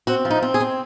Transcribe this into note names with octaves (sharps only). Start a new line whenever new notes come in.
C4 F#4
F3
D#4
C4
G#4
C4